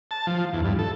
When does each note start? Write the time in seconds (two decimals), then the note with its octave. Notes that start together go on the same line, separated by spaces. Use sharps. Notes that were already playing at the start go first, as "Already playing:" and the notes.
0.11 A5
0.27 F3
0.53 E2
0.65 G2
0.79 A4